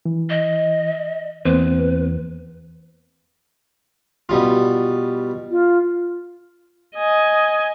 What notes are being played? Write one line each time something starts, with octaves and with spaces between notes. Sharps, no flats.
E3
D#5
E2 A#3 C4 B4 C5
B2 G3 F4
F4
D#5 G#5